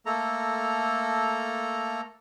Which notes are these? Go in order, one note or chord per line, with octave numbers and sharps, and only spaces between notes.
A3 A#3 A4 A#5